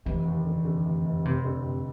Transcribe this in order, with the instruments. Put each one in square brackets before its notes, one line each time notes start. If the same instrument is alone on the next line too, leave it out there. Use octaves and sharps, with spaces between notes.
[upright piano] F1 [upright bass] E3
[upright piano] D#2
D3
D3
F1
F1
[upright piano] F1 [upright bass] C3
[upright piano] D3
F1